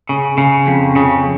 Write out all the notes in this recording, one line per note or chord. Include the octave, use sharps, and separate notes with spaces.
C#3
C#3
F2
C#3